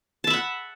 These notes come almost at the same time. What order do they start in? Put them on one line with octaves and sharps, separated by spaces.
A5 E5 B5 F#5